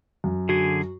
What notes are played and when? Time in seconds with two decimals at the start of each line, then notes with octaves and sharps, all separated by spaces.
0.24 F#2
0.49 D3 F#4 G#4